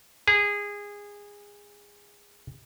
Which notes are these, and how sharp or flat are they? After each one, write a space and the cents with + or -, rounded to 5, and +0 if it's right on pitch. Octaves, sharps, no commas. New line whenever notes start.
G#4 -20